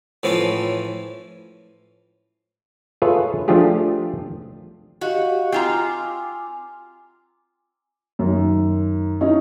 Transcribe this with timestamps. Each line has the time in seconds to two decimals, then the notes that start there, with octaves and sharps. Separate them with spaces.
0.23 A2 E3 F3 C#4
3.02 F4 G#4 A4 B4 C#5 E5
3.48 F3 A3 D4 F4 G4 G#4
5.01 F#4 G4 D#5 F5
5.52 C4 F4 G#5 A#5 D6
8.19 F#2 D#3
9.21 C#4 D#4 E4